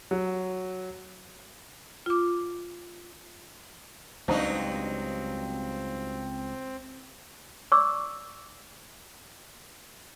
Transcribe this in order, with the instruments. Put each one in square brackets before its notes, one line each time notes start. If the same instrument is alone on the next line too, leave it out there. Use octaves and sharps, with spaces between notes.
[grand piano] F#3
[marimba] F4 D6
[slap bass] C#2 [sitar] G2 F#3 D#4 [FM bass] C4 [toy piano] C5 A5 A#5
[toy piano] D5 C#6 D6 E6